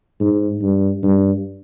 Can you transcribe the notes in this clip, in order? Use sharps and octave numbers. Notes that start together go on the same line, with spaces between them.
G#2
G2
G2